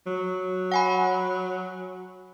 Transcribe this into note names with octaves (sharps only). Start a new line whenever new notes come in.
F#3
F#5 G#5 B5